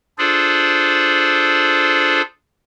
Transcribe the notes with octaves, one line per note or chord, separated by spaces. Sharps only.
D4 F4 G#4 A4 C5 D5